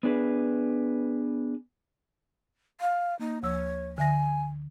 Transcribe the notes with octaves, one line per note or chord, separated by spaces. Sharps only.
B3 D4 G#4 B4
F5
A#3 D#4
D2 F3 C#5 E6
D3 E5 G#5 A#6